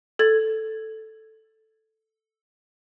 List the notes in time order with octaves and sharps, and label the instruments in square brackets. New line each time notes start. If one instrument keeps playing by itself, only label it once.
[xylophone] A4 G#6 A6